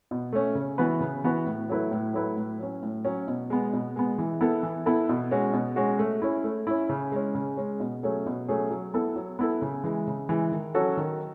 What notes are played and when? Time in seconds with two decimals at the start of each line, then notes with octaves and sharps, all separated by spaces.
0.11 B2
0.33 A3 C#4
0.55 C#3
0.78 E3 B3 F#4 B4
1.00 C#3
1.24 E3 B3 F#4 B4
1.46 A2
1.70 F#3 A3 E4 B4
1.91 A2
2.14 F#3 A3 E4 B4
2.37 A2
2.59 F#3 C#4
2.83 A2
3.05 F#3 C#4
3.28 B2
3.50 G#3 B3
3.73 B2
3.96 G#3 B3
4.18 E3
4.41 B3 E4 A4
4.63 E3
4.86 B3 E4 A4
5.09 B2
5.31 G#3 C#4 F#4
5.53 B2
5.76 G#3 C#4 F#4
5.99 A3
6.22 C#4 E4
6.44 A3
6.67 C#4 E4
6.89 C#3
7.12 G#3 C#4
7.35 C#3
7.57 G#3 C#4
7.80 B2
8.03 F#3 A3 C#4 G#4
8.26 B2
8.48 F#3 A3 C#4 G#4
8.70 F#3
8.94 B3 E4 A4
9.16 F#3
9.39 B3 E4 A4
9.62 C#3
9.84 E3 G#3
10.07 C#3
10.29 E3 G#3
10.52 D#3
10.75 F#3 C#4 F#4 A4
10.97 D#3